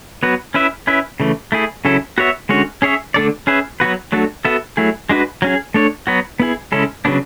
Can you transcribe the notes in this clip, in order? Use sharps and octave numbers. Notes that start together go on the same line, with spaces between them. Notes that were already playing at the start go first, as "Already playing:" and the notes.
F#3 B3 F#4 B4
C#4 E4 B4 E5
C#4 E4 B4 E5
C#3 E3 A3
A3 E4 G#4
C#3 F#3 C#4 E4 A4
B3 F#4 C#5 E5
D3 G#3 C#4 F#4 C#5
C#4 G#4 C#5 E5
D3 A3 D4 A4 D5
C#4 G#4 B4 E5
F#3 B3 F#4 B4
F#3 A3 D4 F#4 A4
B3 F#4 A4 E5
F#3 A3 E4 G#4
G#3 D4 F#4 B4
F#3 C#4 G#4
A3 D4 A4 C#5
F#3 B3 F#4
B3 E4 G#4
C#3 G#3 C#4 E4 A4
C#3 F#3 B3 D4